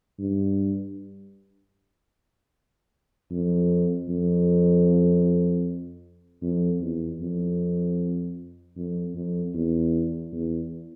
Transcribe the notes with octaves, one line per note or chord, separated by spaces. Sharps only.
G2
F2
F2
F2
E2
F2
F2
F2
E2
E2